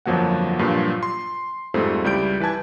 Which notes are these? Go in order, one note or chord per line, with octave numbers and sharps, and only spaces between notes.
G1 F2 F3 F#3 A#3 F#5
G2 A#2 F3 F#3 F4
C6
F2 G#2 F3 G3 A3 C4
C#2 G3 E4 G6 D7
E3 B4 G#5 A5 G#6